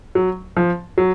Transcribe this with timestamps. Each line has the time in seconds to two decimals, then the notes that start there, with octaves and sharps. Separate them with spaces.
0.15 F#3
0.57 F3
0.98 F#3